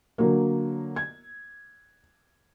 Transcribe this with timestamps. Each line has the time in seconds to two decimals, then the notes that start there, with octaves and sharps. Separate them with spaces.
0.18 D3 F#3 A#3
0.96 G#6